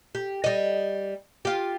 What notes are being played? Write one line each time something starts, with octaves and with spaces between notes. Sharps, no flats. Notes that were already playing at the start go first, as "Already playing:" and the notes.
G4
G3 D#5
F4 G4